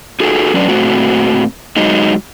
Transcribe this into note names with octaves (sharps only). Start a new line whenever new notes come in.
D#4 F#4 G#4 A4
F#3 C#4 D4 A4 B4 D5
A#2 A3 C4 F#4
F#3 G#3 D#4